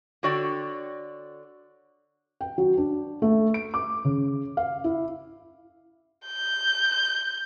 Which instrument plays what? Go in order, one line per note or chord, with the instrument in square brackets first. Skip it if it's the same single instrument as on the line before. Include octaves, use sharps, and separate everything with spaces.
[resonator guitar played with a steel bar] D3 F#4 C#5 D5 G5
[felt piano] G5
F#3
D4
A3
D7
D6
C#3
F5
E4
[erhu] G6